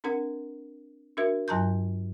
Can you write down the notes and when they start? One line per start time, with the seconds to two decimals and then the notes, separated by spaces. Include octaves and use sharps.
0.04 C4 D4 A#4 F#5
1.17 D4 F#4 A#4 E5
1.48 G2 F#3 A5 A#5 C6 G6